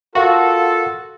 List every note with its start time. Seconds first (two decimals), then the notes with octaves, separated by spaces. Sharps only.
0.15 F4 F#4 A4 A#4 F5 F#5